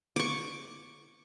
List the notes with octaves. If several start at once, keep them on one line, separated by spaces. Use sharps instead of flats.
C#6 D6